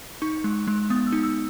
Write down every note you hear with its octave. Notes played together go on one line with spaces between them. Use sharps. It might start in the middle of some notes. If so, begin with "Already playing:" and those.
D#4 C#6
G#3
G#3
B3 D#6
E6
D#4
E6